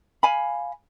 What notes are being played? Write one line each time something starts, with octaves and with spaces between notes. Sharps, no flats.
F5 G#5 B5